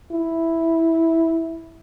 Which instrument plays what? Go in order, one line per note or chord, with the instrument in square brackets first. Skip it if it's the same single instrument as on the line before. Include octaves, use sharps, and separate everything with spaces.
[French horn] E4